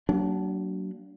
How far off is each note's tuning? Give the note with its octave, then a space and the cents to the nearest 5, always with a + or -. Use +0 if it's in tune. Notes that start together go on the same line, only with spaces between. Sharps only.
F#3 +30 A#3 -10 D4 -20